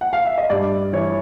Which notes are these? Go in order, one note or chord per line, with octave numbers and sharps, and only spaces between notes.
F#5
F5
E5
D#5
G2 D5
E3 C#5